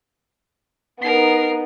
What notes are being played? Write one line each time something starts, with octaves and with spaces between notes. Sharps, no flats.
B3 D#4 A#4 C7